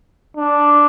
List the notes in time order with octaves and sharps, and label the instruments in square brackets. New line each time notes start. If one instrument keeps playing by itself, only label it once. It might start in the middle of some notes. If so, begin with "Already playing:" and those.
[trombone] D4